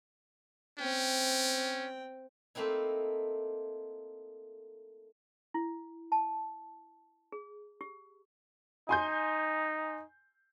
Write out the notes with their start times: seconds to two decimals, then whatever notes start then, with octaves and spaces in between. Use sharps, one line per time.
0.79 C4 C#4 G5
2.55 A3 A#3 C4 D#4 E4
5.54 E4
6.12 A5
7.32 G#4
7.81 G4
8.89 D#4 G#5 C6 G6